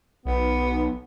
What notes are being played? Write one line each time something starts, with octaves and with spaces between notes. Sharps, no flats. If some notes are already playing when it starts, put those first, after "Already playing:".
B1 B3